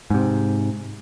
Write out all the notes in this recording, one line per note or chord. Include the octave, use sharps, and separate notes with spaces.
G#2 C3